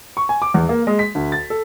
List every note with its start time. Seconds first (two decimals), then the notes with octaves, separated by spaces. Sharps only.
0.17 C#6
0.29 G#5
0.42 D6
0.54 E2
0.69 A#3
0.87 G#3
0.99 B6
1.15 D2
1.32 A6
1.50 A4